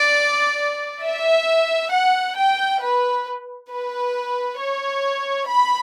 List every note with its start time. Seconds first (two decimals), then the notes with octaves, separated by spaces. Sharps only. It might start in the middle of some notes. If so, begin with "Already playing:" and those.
Already playing: D5
1.02 E5
1.91 F#5
2.36 G5
2.81 B4
3.70 B4
4.59 C#5
5.48 B5